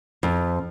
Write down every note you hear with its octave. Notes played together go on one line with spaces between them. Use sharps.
F2